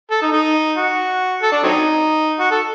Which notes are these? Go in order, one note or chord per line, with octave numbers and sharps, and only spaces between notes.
A4
D#4
D#4
F#4
A4
D4
F#3 C4 D#4
F#4
A4